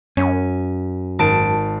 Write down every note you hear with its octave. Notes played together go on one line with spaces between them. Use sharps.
F#2 C#4
G#1 A5 D7